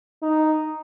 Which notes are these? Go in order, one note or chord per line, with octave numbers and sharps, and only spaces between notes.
D#4